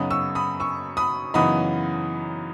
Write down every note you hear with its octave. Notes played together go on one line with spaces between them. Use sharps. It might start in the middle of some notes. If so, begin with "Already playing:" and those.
Already playing: F#2 C#3 F#3 B3 D#4 B5 D#6
C#6 E6
B5 D#6
C#6 E6
B5 D#6
F#2 C#3 E3 B3 D#4 B5 D#6